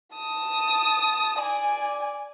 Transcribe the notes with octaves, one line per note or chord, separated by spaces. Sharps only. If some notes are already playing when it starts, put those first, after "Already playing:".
A5 D#6
D5 G#5